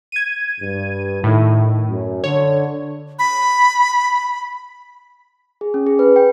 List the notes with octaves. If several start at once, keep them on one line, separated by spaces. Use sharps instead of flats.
G#6 D#7
G2
A2 D#3 A3 E4
F#2
D3 C#5
B5
G#4
C#4
G#4
B4
G5